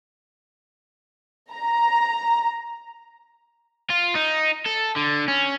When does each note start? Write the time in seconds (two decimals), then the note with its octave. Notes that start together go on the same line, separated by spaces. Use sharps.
1.53 A#5
3.90 F4
4.15 D#4
4.66 A4
4.96 D3
5.28 C#4